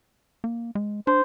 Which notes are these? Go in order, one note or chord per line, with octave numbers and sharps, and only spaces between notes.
A#3
G#3
D4 C5